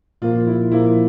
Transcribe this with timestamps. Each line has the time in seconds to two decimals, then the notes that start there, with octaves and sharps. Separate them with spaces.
0.22 A#2 F3 A#3 F4
0.47 E4
0.72 A#2 F3 A#3 E4